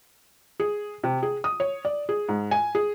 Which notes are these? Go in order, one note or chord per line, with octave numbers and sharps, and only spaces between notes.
G#4
C3
G#4
D#6
C#5
D5
G#4
G#2
G#5
G#4